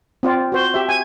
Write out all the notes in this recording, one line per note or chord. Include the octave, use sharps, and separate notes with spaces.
C4 F4 D5
F#4 C5
G4 E5
G#5